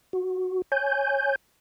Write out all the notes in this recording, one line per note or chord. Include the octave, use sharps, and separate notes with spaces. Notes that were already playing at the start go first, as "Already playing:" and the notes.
F#4
C#5 G#5 G6